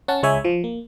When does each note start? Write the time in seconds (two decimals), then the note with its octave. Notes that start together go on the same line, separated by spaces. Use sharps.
0.08 C#4 F#5 A5
0.23 C#2 G#3 C#5 E5 G#5
0.45 F3
0.64 A#3